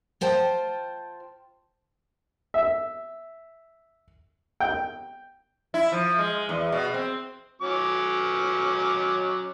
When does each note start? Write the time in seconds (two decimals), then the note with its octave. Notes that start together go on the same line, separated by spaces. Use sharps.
0.21 F4 C5 G5 A5
2.54 E5
4.60 G5
5.74 E4
5.92 F3
6.18 G#3
6.49 E2
6.72 B2
6.94 C4
7.62 F#3 C#4 D6